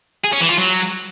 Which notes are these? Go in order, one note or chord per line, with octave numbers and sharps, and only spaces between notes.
G#4
C#4
E3
F4
F#3